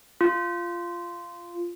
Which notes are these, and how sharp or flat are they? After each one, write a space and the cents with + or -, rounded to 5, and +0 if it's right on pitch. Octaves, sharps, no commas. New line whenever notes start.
F4 -10